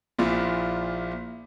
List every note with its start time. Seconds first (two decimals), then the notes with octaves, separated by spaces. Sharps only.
0.19 A#1 A#2 E4 F4